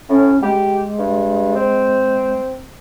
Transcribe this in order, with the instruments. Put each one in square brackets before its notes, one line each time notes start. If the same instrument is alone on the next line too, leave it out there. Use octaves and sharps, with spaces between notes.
[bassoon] A2 [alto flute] C#4
[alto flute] G#3 [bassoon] G4
[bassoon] G2
C4